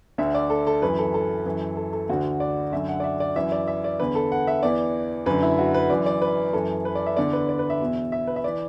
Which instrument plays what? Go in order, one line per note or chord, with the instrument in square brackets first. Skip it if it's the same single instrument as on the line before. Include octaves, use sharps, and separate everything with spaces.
[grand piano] D2 D3 E5
D5
A4
A4
F#2 E3 B4
A4
A4
F#2 E3
A4
A4
D2 D3 F#4
D5
F#2 D3 E5
F#5
D5
E5
D5
F#2 E3 E5
D5
E5
D5
E2 D3 B4
A4
F#5
E5
E2 E3 D5
F#2 D3 B4
E4
F#4
B4
F#2 E3 D5
D5
B4
F#2 E3 A4
B4
D5
E5
E2 D3 D5
B4
D5
B4
E5
E2 B2
E5
B4
E5
E3 D5